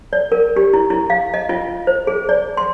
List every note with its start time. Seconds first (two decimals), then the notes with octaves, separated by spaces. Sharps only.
0.13 D5
0.32 A#4
0.56 G4
0.73 E4
0.90 E4
1.10 F5
1.34 D#5
1.49 F4
1.87 C5
2.07 G#4
2.29 D5
2.57 C6